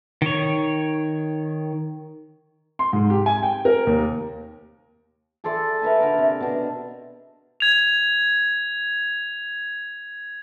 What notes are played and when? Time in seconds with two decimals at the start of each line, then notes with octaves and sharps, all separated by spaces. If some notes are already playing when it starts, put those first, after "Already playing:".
0.22 D#3 C#5
2.79 C6
2.93 G#2
3.10 G4
3.26 G#5
3.43 G5
3.65 A#4
3.87 D#2
5.44 G#4 A4 D5 C6
5.82 A#4 B4 E5 G#5
6.01 D3 A#4
6.18 C3
6.40 B2 D4
7.60 G#6 F7